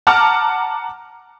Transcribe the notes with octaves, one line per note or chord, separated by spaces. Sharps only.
F#5 A5 A#5 D6 F6